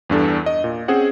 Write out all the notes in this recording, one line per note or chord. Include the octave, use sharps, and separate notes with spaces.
E2 G2 D4 A4
D#5
A#2
C4 C#4 G#4 C5 F#5